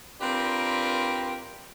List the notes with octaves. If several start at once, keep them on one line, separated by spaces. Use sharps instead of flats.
C4 D4 F4 G4 A#4 B4